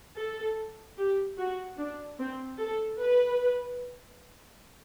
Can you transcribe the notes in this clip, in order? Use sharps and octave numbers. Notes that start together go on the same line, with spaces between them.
A4
G4
F#4
D4
C4
A4
B4